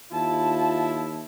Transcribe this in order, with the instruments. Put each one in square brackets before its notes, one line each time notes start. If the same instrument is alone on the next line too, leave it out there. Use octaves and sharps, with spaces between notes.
[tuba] D#2 [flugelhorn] E4 [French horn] F4 [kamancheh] A5